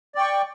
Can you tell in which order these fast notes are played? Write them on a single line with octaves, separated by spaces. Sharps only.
D5 G5 C#6